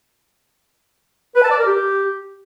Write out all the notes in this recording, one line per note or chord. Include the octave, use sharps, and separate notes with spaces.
B4
A5
D5
A#4
G4